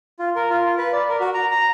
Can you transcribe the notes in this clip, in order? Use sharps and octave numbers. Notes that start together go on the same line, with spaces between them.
F4
A#4
F4
F4
B4
D5
A#4
F#4
A#5
A#5